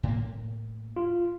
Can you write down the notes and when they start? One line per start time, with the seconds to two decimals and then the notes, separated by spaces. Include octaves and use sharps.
0.03 A2 A#3
0.96 F4